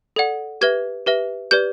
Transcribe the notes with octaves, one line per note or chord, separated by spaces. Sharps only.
A4 D5 F#5
G4 B4 E5 G#6
G4 B4 E5
G4 B4 D5 G6